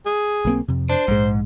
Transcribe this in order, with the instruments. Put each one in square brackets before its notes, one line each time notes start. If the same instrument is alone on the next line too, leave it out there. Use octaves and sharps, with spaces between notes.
[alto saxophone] G#4
[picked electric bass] B1 A#3 C4
F2 C3
[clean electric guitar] D4 [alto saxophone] C5
[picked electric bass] A#1 G#3 [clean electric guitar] G#2